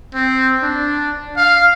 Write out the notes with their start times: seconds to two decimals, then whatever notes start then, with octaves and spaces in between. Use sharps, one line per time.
0.14 C4
0.63 D4
1.37 F5